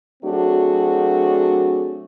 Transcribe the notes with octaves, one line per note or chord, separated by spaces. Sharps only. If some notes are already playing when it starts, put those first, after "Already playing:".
F#3 A3 C4 D4 F#4 G#4